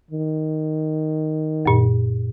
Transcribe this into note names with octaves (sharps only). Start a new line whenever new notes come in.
D#3
F#2 A#2